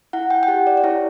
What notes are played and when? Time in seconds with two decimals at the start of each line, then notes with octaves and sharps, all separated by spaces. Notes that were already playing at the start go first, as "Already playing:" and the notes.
0.13 E4 F#5
0.30 G5
0.43 G5
0.48 G4 F#5
0.67 D5
0.77 D5
0.84 E4 C#5